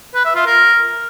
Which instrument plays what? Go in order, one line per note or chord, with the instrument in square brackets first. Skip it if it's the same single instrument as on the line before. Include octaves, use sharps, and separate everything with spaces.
[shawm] B4
E5
F4
A#4